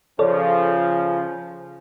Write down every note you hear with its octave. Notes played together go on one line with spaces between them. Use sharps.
C#3 F3 A4 C#5 D5